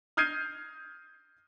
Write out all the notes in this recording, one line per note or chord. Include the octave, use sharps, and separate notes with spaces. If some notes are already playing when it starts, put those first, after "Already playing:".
D#6 F6 G6 G#6 C7 D#7